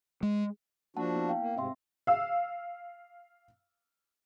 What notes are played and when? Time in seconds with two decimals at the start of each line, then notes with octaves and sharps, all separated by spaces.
0.23 G#3
0.97 F3 A#3 D4 F#4 F#5 A5
1.16 B3 E4
1.29 F5 G5
1.41 A#3
1.57 G#2 C3 C4 E5 C6
2.07 F5 E6